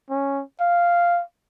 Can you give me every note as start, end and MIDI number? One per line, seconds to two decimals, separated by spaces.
0.10 0.43 61
0.60 1.22 77